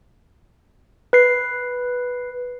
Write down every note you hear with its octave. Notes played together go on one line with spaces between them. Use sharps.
B4 C7